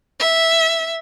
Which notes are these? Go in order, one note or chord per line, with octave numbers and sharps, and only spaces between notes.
E5